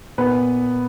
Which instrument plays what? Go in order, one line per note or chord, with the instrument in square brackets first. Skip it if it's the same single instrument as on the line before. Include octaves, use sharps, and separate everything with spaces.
[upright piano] A#2 B3 B4